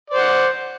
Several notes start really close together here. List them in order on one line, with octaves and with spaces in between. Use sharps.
D5 C5 F#5